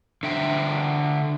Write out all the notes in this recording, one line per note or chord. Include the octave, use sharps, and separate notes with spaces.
D3 E5 G5